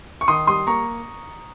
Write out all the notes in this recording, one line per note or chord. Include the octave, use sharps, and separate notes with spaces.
C#6
D#3 C6 D#6
G3 C6 D#6
A#3 A#5 C#6